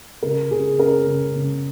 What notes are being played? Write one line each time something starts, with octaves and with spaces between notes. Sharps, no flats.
C#3 A#4
C#3 G#4
C#4 A#4
C#3
C#3